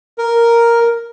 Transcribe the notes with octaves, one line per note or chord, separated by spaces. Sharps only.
A#4